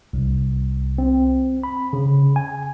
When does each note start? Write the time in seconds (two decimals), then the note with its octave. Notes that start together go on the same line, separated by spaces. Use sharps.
0.13 C2
0.98 C4
1.63 B5
1.93 C#3
2.36 G#5